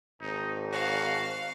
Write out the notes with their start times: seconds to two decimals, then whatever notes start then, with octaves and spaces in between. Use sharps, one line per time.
0.21 G#1 D#4
0.72 F#4 F5